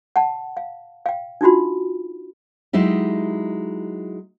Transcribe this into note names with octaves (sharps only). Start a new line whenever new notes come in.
F#5 A5
F5
F5 G5
D4 D#4 F4 F#4 B5
F#3 G#3 D#4 E4 G4